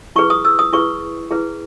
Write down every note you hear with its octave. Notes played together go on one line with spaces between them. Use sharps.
E4 G#4 B4 C#6
D#6
E6
D#6
E4 G#4 B4 C#6
E4 G#4 B4